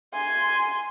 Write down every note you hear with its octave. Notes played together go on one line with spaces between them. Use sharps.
G#5 C6